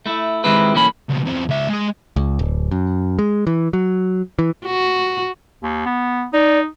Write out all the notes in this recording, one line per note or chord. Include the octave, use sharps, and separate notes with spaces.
A3 E4
D#3 G#3 C4 E4 G4 B4
B1 E3 A#3 C#4 A4 B5
C#2 B2
E2 C4
C#2 E5
G#3 G#4
C#2
D1
F#2
G#3
E3
F#3
E3
F#4
D#2
B3
D#4 D5